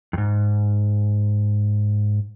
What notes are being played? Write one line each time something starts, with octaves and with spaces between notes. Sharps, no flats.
F2 G#2